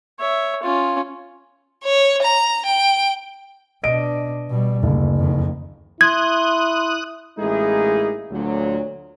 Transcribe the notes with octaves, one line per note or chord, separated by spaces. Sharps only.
C#5 E5
C#4 F4
C#5
A#5
G5
B2 D4 D#5 D7
B2 G3
F#1 D2
F2 D#3
E4 C6 D#6 F#6 G#6
A1 G#3 A#3 D#4 E4 G#4
D2 A#2 F#3